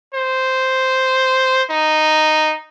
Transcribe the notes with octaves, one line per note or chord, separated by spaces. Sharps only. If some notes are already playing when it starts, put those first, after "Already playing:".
C5
D#4